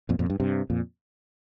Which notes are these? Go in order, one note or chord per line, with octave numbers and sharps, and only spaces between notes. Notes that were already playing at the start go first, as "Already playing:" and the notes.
F2 A#2
F2 A#2
G2
G2 C3
F2 A#2